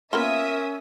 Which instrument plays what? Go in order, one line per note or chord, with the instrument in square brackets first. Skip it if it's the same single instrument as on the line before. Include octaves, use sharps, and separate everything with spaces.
[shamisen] A#3 B3 F4 [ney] C#4 [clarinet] A#4 [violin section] E5 D#6